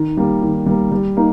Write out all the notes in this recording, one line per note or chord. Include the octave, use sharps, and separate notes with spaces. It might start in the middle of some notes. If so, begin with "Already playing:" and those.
Already playing: D#3
G3 A#3
D#3
G3 A#3
G3
A#3 D#4